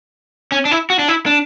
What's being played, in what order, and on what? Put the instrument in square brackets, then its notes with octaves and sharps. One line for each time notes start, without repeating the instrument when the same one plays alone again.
[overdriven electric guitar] C#4
D4
E4
F#4
D4
E4
D4